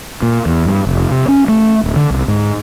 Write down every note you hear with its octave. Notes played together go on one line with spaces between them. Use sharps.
A#2
E2
G2
F1
C3
C#4
A3
D1
D3
C2
G#2